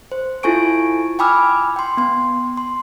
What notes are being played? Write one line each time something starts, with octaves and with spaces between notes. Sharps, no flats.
C5
E4 F4 A4 G#5 C#6 D7
G5 G#5 B5 D6 E6 F6
G5 C6
B3 C6
C6